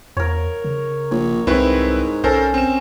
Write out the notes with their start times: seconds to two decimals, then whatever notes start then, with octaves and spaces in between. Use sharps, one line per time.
0.17 E2 A#4 C#5
0.64 C#3
1.11 A#1 C#5
1.47 C2 G#2 C4 E4 A#4 B4 C#5
2.24 B1 C#4 A4 A#4 C5
2.54 C4 E7